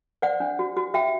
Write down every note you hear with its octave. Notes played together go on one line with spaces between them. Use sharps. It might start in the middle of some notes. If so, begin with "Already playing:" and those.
C5 D5 F#5
D4
F#4
F#4
F#4 E5 G5